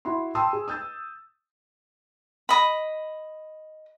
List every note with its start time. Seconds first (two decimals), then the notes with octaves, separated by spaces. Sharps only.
0.05 E4 F#4 C6
0.35 G5 A5 C6 D#6 E6
0.53 G#4
0.68 D#6 E6 G6 A6
2.49 D#5 B5